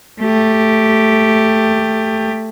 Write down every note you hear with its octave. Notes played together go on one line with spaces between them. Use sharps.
A3 G4